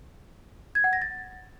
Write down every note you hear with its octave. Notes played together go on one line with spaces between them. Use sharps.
G#6
F#5
A#6
A6